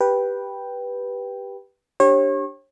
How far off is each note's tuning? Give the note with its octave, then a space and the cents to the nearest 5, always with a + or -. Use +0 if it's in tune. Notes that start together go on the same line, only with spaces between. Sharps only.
G4 +0 B4 -10 G5 +0
D4 +0 G4 +0 C#5 -35